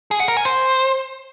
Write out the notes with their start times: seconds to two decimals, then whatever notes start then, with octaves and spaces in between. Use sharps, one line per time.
0.11 G#4
0.20 F#5
0.28 A#4
0.37 G#5
0.45 C5